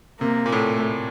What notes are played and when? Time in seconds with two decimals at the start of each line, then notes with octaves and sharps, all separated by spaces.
0.21 C3 A#3
0.46 A#2
0.52 A2 A3